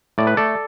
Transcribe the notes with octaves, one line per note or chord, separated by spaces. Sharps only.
A2 D5
B4
A3 A4 D5